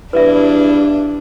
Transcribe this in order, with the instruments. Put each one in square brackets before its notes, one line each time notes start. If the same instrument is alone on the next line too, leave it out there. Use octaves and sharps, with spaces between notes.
[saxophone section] E2 G2 E4 [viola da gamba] D4 [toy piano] B4 E5